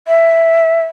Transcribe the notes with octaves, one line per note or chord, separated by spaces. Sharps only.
E5